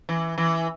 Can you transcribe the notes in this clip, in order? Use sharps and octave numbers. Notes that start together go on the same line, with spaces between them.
E3
E3